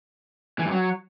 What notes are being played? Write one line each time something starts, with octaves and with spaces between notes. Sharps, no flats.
E3
G2
F#3